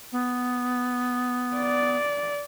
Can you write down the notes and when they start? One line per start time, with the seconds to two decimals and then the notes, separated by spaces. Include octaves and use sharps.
0.12 B3
1.57 D5